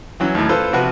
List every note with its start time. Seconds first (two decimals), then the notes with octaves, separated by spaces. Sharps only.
0.20 E3 F#3 C#4
0.35 D#2 A2
0.49 F4 A4 B4 C5
0.73 C3 F3 F#4 B4